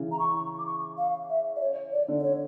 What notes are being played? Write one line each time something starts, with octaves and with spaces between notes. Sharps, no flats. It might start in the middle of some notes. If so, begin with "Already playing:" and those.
Already playing: C#3 E3
A#5
C#6
D6
C#6
F5
E5
D5
C#5
D5
D3
D5
C#5